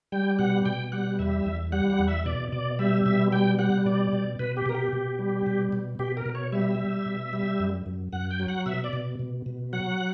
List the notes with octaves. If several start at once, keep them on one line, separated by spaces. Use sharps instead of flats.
G3 G5
B2 F#5
B2 G5
G3 F#5
E2 E5
E2
G3 F#5
F#5
E2
E5
B2 D5
B2 D5
G3 E5
B2 E5
G3 G5
G3 F#5
B2 D5
B2
B2 B4
G4
B2 A#4
G4
B2
G3
B2
B2
B2 G4
A#4
B2
C#5
G3 E5
G3
B2
G3
F#2
F#2
F#2 F#5
G5
F#3
F#5
B2 E5
D5
B2
B2
B2
F#3 F#5